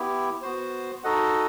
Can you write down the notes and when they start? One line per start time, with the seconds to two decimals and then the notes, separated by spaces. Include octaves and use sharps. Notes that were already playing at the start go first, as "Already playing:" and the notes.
Already playing: B3 E4 G4
0.42 B3 F#4 C5
1.04 D#4 F#4 A4 D#5 F#5